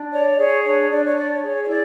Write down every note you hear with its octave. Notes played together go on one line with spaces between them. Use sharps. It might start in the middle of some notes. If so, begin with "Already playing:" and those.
Already playing: D4
C#5 D5
G#4 C#5
D4 C#5
D4 D5
C#5
C#5 D5
C#5
G#4 C#5
C#5
E4 D5